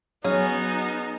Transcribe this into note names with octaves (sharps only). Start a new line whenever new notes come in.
F#3 B3 C#4 D#4 G#4